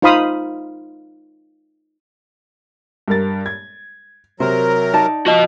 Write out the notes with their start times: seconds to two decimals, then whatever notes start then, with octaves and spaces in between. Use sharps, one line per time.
0.02 D#4 F4 C5 F5 B5 D#6
3.08 G2 A#4 A6
3.46 G#6
4.40 C3 F#3 A#4 C5
4.93 D#4 D5 A5
5.26 F3 F#4 D#5